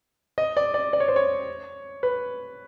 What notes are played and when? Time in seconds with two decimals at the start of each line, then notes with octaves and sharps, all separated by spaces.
0.38 D#5
0.57 D5
0.74 D5
0.93 D5
1.00 C#5
1.08 C5
1.16 C#5
2.03 B4